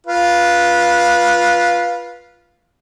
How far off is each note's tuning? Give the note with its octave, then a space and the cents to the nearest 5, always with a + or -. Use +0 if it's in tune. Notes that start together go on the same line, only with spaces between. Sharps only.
F4 +0 B4 -20